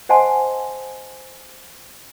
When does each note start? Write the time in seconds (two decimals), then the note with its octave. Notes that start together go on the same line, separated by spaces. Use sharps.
0.09 C5 D#5 F#5 G#5 A5 C6